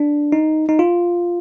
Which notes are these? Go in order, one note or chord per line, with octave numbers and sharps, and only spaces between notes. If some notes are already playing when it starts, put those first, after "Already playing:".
Already playing: D4
D#4
D#4
F4